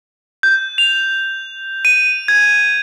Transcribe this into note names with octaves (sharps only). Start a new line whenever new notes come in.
G6
F7
D#7
G#6